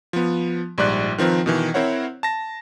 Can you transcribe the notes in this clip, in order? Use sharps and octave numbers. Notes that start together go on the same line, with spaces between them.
F3 B3
A#1 G#2 G3 D5 F#6
D#3 F3 C4 A#4 B4
B2 D#3 E3
C4 E4 A#4 C5 C#5 F#5
A5 A#6